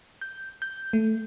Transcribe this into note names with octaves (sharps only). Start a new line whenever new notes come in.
G6
G6
A3